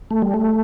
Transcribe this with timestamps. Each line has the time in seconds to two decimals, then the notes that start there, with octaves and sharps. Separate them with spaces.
0.11 A3
0.22 G3
0.34 A3